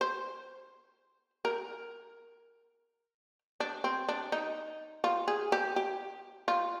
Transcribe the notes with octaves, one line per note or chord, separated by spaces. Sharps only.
C5
A#4
D4
C4
D4
D#4
F4
G#4
G4
G4
F4